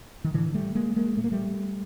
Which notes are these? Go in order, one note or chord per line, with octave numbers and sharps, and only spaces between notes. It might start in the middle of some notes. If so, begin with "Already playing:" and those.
D#3
A2 D3 E3
G3 A3
G#3 A#3
G#3 A#3
A#2 A3
A#3
G3 A3